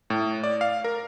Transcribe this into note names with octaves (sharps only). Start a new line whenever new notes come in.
A2
D5
F5
A#4